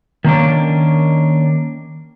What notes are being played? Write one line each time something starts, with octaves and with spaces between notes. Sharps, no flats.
D#3 A#3 C#4 D4